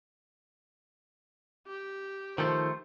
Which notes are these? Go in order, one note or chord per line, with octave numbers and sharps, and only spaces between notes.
G4
D#3 F3 A3 C5